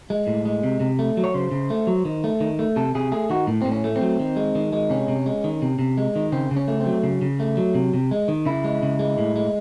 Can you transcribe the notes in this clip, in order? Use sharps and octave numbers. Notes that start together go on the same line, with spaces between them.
G#3
A2
G#3
C3
C3
A3
F#3
C#5
C#3 C5
C#3
A3
F#3
D#3
A3
D#3
A3
C3 A4
C3 G#4
A3 G#4
D#3 F#4
A2
A2 C4
C#4
A3
C4
F#3
D#3
G#3
D#3
G#3
C3 C#4
C3
G#3
D#3
C3
C3
G#3
D#3
C#3 C4
C#3
C#4
A3
C4
F#3
C#3
C#3
A3
F#3
C3
C3
G#3
D#3
C#3 E4
G#3
C#3
G#3
A2
G#3